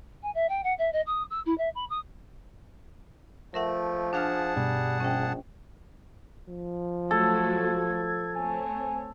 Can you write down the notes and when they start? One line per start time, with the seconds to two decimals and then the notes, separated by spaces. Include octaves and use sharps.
0.22 G#5
0.34 E5
0.49 G5
0.63 F#5
0.78 E5
0.92 D#5
1.06 D#6
1.30 E6
1.45 E4
1.57 E5
1.75 B5
1.89 D#6
3.54 F3 A3 A#4 E5 F#5
4.13 D4 G#4 F5 F#5 A5 F6
4.56 G2 B2 G3
5.00 A#1 C#4 G5
6.48 F3
7.11 F#3 A3 F#4 A4 G#6
8.35 A3 C4 C#5 G#5